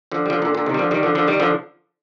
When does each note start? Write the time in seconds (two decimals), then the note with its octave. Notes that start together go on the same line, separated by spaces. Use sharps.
0.12 D3 F3
0.26 G3
0.30 D3 F3
0.42 A#2 D3
0.55 A#2 D3
0.66 C3 D#3
0.74 G3
0.79 D3 F3
0.91 D#3 G3
1.03 D3 F3
1.15 D3 F3
1.28 D#3 G3
1.40 D3 F3